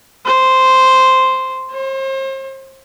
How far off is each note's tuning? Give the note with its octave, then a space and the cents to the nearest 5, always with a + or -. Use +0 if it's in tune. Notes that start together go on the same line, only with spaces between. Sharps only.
C5 -5
C5 +40